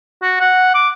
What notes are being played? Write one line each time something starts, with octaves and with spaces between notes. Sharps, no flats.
F#4
F#5
D6